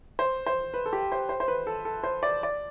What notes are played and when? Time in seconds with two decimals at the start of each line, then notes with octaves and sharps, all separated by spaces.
0.19 C5
0.46 C5
0.74 B4
0.86 A4
0.93 G4
1.12 C5
1.29 C5
1.40 C5
1.48 B4
1.67 A4
1.85 A4
2.03 C5
2.23 D5
2.43 D5